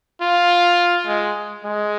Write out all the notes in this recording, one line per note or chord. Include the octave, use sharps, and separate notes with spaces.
F4
G#3
G#3